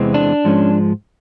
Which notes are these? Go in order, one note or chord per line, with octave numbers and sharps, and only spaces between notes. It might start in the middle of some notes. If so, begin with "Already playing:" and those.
Already playing: E2 C3 E3 G#3 C4
D4
G#2 F3 G#3 C#4